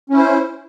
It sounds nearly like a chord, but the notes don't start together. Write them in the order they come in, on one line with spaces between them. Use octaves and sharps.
C#4 E4 C5